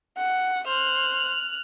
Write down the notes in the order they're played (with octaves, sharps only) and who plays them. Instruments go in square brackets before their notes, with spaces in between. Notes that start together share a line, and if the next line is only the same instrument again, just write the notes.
[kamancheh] F#5
[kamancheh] C5 [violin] F6 F#6